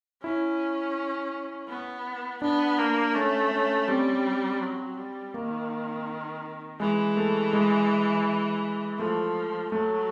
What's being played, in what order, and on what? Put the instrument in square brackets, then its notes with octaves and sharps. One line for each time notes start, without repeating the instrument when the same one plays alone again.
[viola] C#4 [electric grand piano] E4
[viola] B3
[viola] B3 [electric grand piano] D4
[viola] A#3
[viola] A3 [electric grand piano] C#4
[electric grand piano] C#4
[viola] G3 [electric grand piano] C4
[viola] F#3
G3
[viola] D#3 [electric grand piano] A#3
[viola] E3 [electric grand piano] G#3
[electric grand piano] A3
G#3
[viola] F3 [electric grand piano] A3
[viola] F#3 [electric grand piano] A3